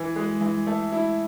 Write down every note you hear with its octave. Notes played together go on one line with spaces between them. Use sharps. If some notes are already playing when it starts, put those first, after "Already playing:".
Already playing: E3
G#3
E3
A3
E4